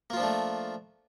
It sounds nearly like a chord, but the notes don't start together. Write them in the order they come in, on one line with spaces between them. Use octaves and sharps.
A#3 F4 F3 D4 A3